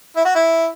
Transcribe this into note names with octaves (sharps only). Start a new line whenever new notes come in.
E4
F#4
E4